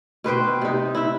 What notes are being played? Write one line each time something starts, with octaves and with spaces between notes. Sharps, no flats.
B2 B4 C5 G5
C3 D#4
E4 E5